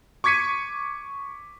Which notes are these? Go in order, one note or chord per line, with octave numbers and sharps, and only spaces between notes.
C#6 D6 G#6 B6 C#7 D#7